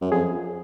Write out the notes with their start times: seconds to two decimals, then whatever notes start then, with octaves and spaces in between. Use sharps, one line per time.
0.01 F#2
0.12 F2 G#4